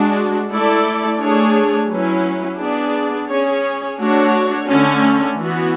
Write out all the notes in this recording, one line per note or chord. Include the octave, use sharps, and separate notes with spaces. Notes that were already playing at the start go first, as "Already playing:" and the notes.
Already playing: G#3 D4 F#4
A3 E4 A4 D5
A3 D4 G#4 C#5
F#3 C#4 E4 B4
B3 D4 G#4 D5
C#4 G#4 C#5
A3 D4 F#4 C#5
D3 A3 C#4
E3 B3 F#4